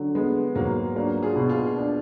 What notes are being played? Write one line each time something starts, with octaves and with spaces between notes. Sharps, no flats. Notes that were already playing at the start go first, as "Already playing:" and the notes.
Already playing: D3 F#3
G#3 B3
G#2 F#3 A#3
F#3 A#3 D4
F4 G#4
B2
F4 G#4
D4